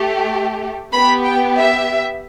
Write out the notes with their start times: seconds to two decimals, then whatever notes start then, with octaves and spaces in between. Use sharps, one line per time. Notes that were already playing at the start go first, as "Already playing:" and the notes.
Already playing: A3 G4
0.92 B3 G4 B5
1.24 G5
1.57 E5